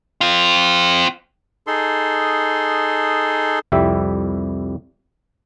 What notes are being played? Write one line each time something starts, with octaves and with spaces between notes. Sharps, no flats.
C4 F4
D#4 G#4 A4 C6
C2 F2 G3 E4 G4 E5